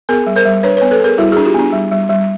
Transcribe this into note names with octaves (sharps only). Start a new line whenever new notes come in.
B3 G#4 A#4
G3
A#4 C5
G3
D4 B4 C#5
B4 C#5
B3
A4 B4
B3 G#4 A#4
G3 E4 F#4
D4 F#4 G#4
F4 G4
B3 D4
G3
G3
G3